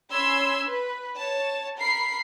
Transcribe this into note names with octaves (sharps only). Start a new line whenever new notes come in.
C#4 B5 C6 E6 G#6
B4
C#5 A5
A#4 B5 C7